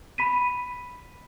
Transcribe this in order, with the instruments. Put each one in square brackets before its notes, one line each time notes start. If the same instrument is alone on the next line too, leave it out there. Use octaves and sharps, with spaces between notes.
[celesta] B5 B6 D#7